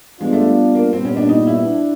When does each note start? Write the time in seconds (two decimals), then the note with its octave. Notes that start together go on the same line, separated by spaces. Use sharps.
0.21 G3 G#3 B3 D4 F4
0.33 A3
0.75 A#3
0.93 A#2 G3 B3 C4
1.05 C#4
1.17 D4
1.29 D#4
1.47 E4
1.65 D4